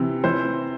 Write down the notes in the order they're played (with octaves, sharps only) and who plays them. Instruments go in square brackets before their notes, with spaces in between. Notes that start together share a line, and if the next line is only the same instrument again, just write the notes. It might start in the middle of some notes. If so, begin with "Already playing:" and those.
Already playing: [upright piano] C3 E3
E3 C5